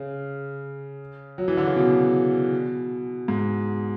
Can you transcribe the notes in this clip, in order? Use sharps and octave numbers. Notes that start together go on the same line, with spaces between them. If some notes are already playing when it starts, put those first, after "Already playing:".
Already playing: C#3
F#3
E3
D3
C#3
B2
G#2